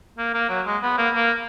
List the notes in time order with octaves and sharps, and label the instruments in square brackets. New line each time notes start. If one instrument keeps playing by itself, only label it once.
[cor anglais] A#3
A#3
F#3
G#3
B3
A#3
A#3